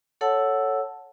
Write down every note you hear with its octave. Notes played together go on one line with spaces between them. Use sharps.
A4 C#5 F#5 A5 E6